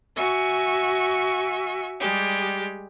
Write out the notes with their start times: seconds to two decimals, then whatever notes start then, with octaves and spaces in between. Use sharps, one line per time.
0.15 F#4 E5 G#5 C#6
2.00 G3 G#3 G4 G#4